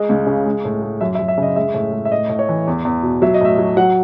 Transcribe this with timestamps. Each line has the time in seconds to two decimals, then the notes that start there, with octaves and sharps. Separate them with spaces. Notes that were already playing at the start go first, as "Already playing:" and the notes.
Already playing: G#3 D#5
0.09 C#2
0.27 C#3
0.45 G#3
0.65 A2
0.82 G#3
1.01 F#2 E5
1.15 E5
1.19 F#2
1.28 E5
1.38 C#3 D#5
1.56 G#3 E5
1.74 A2
1.92 G#3
2.05 E5
2.11 A2 D#5
2.29 A2
2.39 C#5
2.49 E3
2.67 E2
2.85 E2
3.03 B2
3.22 F#3 E5
3.34 D#5
3.41 A2 E5
3.58 F#3
3.77 F#3 F#5